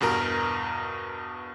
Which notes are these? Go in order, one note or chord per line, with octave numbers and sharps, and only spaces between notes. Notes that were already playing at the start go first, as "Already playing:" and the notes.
E2 G2 B2 A#4 A#5